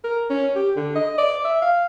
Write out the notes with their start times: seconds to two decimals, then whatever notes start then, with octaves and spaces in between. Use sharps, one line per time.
0.04 A#4
0.30 C#4
0.55 G4
0.76 D3
0.95 D#5
1.18 D5
1.45 E5
1.62 F5